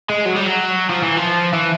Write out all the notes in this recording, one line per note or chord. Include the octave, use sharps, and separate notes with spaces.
G#3
F#3
G3
F#3
F3
E3
F3
E3